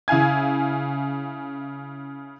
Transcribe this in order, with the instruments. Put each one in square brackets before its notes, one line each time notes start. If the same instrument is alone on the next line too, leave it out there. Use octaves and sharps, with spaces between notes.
[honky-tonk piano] C#3 E4 F5 G#5 G#6